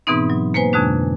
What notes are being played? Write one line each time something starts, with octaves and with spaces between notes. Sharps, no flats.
G#2 B2 E3 B3 C4 D#4
F#3
A#3 B4 C5 G#5
F2 B2 D3 G#3 D4